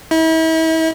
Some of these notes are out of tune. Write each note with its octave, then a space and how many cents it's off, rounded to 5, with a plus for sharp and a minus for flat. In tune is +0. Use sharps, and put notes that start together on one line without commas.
E4 -40